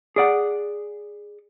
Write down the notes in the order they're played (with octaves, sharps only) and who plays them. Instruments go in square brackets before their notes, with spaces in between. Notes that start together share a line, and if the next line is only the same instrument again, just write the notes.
[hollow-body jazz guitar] G#4 D5 F#5